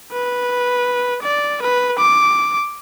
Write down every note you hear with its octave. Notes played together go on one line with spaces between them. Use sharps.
B4
D5
B4
D6